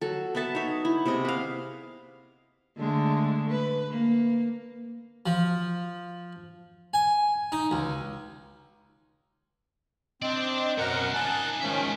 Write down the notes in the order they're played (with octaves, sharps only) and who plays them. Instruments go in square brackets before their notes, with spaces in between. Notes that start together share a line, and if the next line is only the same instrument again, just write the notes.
[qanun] F#3 A4
B3 A4 E5 A5
D#4 C#5 E5
E4
C3 B3 G#4 D#5
B4 F5
[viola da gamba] D3 G#3 A3
B4
A#3
[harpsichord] F3
G#5
D#4
C#2
[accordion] C4 [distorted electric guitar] D4 D5 [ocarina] D#5
[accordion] F#2 A#4 F#5 [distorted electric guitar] B2 A#5
[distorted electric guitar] D#4 D5 [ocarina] G#5 [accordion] A5 F#6
[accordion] D#3 F3 C#4 [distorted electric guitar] G#3 E5